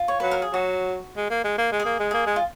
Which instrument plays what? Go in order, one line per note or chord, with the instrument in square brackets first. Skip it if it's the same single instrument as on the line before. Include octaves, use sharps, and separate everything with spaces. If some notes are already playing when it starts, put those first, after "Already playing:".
Already playing: [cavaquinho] F4
C#5
[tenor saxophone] F#3 [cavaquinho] B4
[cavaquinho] A#4
G#4
[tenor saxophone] F#3 [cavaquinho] F#4
[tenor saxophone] G#3
A#3
G#3
A#3
G#3
[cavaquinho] G#4
[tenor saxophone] A#3
G#3
[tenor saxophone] A#3 [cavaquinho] G#4
[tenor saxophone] G#3
[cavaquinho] F4